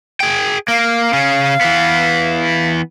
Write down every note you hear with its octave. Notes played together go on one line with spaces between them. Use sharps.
G#4 G5
A#3 F5
C#3 C#4
E3 B3